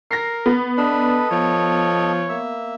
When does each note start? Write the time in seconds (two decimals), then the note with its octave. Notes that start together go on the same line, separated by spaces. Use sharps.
0.11 A#4 A#6 C7
0.46 B3
0.78 D4 A4 B4 D#5
1.31 F3 C#5
2.29 A#3 E5